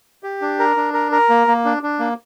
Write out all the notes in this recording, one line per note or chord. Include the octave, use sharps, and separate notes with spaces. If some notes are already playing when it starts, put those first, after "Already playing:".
G4
D4
A#4
D4
A#4
A#4
A#3
A#3
D4
D4
A#3